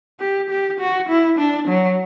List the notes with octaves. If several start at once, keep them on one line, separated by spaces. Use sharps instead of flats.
G4
G4
F#4
E4
D4
F#3